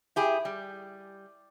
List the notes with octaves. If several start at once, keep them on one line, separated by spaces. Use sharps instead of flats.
E4 G4 G#4
G3